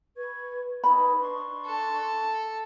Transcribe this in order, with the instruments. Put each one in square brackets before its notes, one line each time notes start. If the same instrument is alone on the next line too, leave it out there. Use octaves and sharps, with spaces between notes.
[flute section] B4 C#6 G#6
[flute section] D#4 G#4 B4 [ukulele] B5
[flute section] D4 C6 C#6
[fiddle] A4